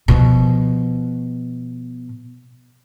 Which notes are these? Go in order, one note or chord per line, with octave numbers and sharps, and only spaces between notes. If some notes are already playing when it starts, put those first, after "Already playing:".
B2 F3